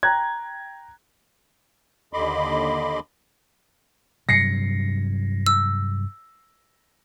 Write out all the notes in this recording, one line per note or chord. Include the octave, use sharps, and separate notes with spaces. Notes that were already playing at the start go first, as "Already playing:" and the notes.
G5 A#5 F#6 G#6
D#2 D3 D#5 B5 C6 D6
G2 C3 F#3 A#6 C7 C#7
E6